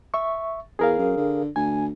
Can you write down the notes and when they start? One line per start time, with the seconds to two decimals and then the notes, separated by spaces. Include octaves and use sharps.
0.14 E5 C#6
0.79 E2 G#4 A#4 F5
0.98 F#2
1.17 D3
1.56 D2 G#5